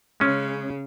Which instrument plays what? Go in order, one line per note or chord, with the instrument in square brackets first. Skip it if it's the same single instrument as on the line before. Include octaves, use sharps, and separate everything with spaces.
[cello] C#3 [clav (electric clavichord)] G#3 C#4